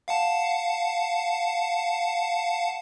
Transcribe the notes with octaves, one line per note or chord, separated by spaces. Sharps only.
F5 F#5 A5